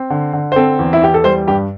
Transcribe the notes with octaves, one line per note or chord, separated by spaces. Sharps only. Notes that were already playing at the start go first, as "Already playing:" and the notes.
Already playing: C4
D3
D3
C5
C4 A4
E2
E4
E2 G4
A4
G3 C5
G2 G4